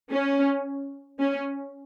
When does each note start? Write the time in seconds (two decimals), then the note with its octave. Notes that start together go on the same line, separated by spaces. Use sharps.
0.12 C#4
1.20 C#4